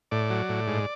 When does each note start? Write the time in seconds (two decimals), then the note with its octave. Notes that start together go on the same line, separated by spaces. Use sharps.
0.11 A2 D5
0.30 F#3
0.49 A2
0.68 G#2